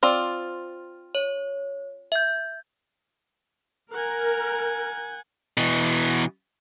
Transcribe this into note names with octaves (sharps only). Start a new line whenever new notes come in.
C4 F4 D5 F6
C#5
E5 G6
A#4 F#5 G#5
B2 E3